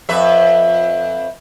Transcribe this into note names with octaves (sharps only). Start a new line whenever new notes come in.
F2 B4 E5